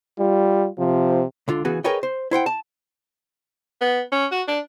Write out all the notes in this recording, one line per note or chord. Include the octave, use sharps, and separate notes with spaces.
G3 F4
C3 F3
C#2 D3 F4
C#3 E3 B3 F#4 G#4
G#4 A#4 B4 C#5 D#5 G5
C5
E4 C5 F#5 G5
A5
B3
C#4
F#4
D4